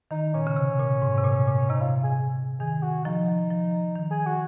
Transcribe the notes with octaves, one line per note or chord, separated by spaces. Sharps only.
D#3 D#4
A#2 C#4
C#3
C3
A#2
G#2
C3
A#2
A#2
C3 D#4
F4
G#4
D#3 G#4
F#4
F3 D#4
F3
D#3
G#4
F#4